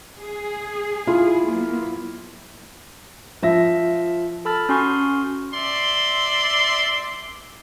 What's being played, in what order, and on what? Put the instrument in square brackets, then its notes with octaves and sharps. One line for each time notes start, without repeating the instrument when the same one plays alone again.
[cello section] G#4
[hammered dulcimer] E4 [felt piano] F4
[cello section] F#3 A#3 B3
[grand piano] F3 E5 A#6
[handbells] A4 A5 B5 E6 F6 A6
C#4 F#4 G#5 C6 C#6 F6
[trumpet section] D5 E5 C6